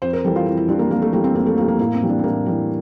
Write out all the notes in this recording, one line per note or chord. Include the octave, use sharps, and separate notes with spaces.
F2 C5
A#4
E3 G3 A4
F4
F2 E4
E4
E3 G3 D4
A#3
F2 A#3
A3
E3 G3 A#3
C4
F2 A#3
A3
E3 G3 A#3
A#3
A2 A#3
C4
E3 G3
D4
C4
A2 A#3
E3 G3